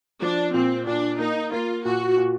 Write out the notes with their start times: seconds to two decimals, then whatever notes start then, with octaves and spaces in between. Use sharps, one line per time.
0.22 F3 D4
0.54 A#2 C4
0.87 A#2 D4
1.19 A#3 D#4
1.52 A#3 F4
1.85 A#2 F#4
2.17 A#2